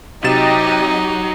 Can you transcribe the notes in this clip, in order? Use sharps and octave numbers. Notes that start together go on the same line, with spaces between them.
C3 F#3 D#4 G4 D#5 A6 E7